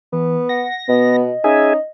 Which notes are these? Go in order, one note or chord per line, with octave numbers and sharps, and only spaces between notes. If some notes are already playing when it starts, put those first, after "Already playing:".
E3 B3
F#5 A#6
B2 B3 D#5
C#4 D#4 G#4 E5 G#5